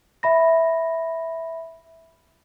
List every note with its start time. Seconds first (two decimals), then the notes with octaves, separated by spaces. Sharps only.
0.23 E5 B5 A#6